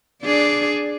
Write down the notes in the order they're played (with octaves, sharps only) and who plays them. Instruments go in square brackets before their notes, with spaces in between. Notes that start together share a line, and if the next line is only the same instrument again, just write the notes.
[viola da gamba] D4 G#4 D5